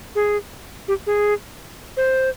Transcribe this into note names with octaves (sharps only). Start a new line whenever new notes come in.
G#4
G4
G#4
C5